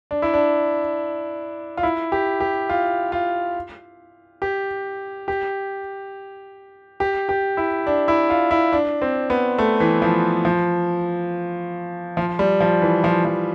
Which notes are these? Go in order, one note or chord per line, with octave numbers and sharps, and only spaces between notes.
D4
E4
D4
F4
E4
G4
G4
F4
F4
G4
G4
G4
G4
E4
D4
E4
F4
E4
D4
C4
B3
A3
E3
F3
F3
F3
G3
F3
E3
F3
F3